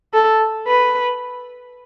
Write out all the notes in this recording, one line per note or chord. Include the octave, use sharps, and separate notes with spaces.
A4
B4